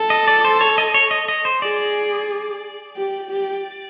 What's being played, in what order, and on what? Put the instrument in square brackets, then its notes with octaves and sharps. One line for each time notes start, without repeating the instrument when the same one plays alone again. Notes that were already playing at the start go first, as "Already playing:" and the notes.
Already playing: [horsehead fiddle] A4
[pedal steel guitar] D#5
D5
C5
C#5
D#5
C#5
D#5
D#5
C5
[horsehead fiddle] G#4 [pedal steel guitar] D5
[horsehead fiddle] G4
G4